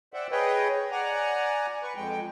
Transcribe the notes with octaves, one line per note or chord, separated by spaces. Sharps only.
C5 D5 E5 F#5 G5
G#4 B4 C#5 D#5 G5
D5 F#5 G#5 A#5
B4 C#6
F2 G#3 G5